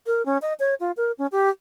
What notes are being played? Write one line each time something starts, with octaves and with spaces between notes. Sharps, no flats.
A#4
C#4
D#5
C#5
F4
A#4
C#4
G4